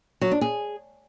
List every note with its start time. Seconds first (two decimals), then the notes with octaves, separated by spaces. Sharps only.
0.21 F#3
0.31 D4
0.41 G#4